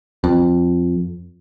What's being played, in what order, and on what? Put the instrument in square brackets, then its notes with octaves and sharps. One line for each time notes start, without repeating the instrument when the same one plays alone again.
[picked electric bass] F2